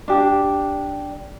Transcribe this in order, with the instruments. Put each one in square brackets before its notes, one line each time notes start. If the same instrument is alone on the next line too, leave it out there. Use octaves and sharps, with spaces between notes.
[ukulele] D4 G4